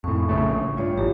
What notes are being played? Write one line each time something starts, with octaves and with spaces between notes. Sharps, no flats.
F2 A2 C#6
A#1 C#3 A3
G2 F4 C#5
A1 G4